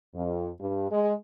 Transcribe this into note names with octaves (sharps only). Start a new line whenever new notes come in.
F2
G2
G#3